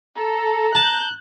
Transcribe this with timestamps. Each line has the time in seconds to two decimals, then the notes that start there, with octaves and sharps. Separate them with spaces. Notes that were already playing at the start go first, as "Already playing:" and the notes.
0.17 A4 A#5
0.75 A5 F#6 G6